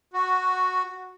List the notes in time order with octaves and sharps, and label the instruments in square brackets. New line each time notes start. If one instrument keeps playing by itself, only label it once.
[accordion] F#4